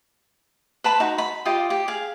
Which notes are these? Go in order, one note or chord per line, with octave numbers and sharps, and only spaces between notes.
B4 A5 B5 C6
D#4 F#4
B5
F4 G4 D#5 G5
G4
G#4 F5